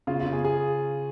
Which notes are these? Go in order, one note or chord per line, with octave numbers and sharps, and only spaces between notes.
C#3 F4
F4
C#3
G#4
G#4